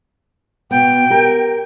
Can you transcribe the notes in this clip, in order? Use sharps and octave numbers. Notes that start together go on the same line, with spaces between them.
B2 B3 G5
G4 A#4